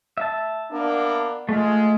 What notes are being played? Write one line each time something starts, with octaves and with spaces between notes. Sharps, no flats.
E5 A5
A#3 B3 D4
G#3 A3 F4